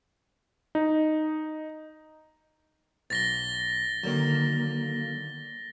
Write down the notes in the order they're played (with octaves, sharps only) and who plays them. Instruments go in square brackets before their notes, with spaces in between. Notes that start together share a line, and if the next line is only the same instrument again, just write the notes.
[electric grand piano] D#4
[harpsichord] B1 [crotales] A6 A#6 G7
[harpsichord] D3 D#3 [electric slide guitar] F#3 A#3